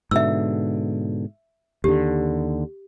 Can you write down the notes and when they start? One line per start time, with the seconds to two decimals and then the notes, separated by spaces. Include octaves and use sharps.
0.11 G#2 B2 D3 E5 E6
1.84 D#2 D3 G4